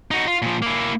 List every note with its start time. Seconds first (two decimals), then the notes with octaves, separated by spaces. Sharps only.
0.11 D#4 F#4
0.27 F4
0.42 A#2 F3
0.62 A#3 E4